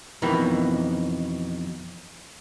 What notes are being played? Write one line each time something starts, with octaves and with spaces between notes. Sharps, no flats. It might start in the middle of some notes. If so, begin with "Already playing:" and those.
F2 B2 D#3 E3